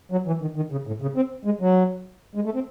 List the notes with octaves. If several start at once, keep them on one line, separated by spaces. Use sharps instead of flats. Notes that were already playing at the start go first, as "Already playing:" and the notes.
F#3
E3
D#3
D#3
C#3
A2
C#3
C4
G#3
F#3
G#3
A3
C4